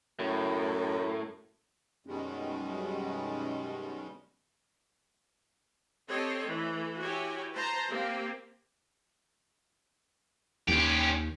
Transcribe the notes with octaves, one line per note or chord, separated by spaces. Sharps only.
F#2 A2
F#2 B2 D#3 G3 G#3
C4 G4 A4 C5 C#5 D#5
E3 A3
E4 F#4 G4 C#5 G#5
B4 C5 A5 A#5
A#3 C4 G4
D#2 C#4 G4